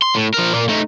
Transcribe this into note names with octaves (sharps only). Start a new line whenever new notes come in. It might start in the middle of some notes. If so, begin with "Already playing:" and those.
C6
A2
F3 A#4
A#2 A#3
A3 D#4